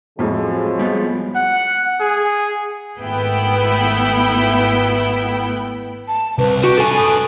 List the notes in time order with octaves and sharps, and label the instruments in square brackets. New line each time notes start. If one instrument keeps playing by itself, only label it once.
[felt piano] F2 A2 [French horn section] F3 F#3 G#3
[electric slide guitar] G3 B3 F4
[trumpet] F#5
G#4
[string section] G#1 A3 B3 E4 G5 B5
[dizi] A5
[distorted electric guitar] C2 [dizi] B4
[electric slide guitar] F#4 [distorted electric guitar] G4 [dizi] C#6
[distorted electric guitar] D4 B4 [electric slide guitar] A4 G#5
[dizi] D#6